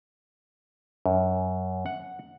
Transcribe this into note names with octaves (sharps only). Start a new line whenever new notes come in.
F#2
F#5